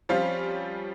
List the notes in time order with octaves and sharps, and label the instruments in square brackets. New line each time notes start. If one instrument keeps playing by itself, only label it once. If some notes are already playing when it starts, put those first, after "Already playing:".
[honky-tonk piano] F3 G3 C4 C#4 F4